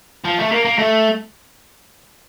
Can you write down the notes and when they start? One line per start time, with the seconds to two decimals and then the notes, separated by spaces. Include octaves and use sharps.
0.25 F3
0.39 A3
0.52 A#3
0.65 A#3
0.78 A3